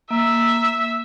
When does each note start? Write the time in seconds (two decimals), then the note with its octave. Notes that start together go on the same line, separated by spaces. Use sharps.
0.10 A#3 E5 E6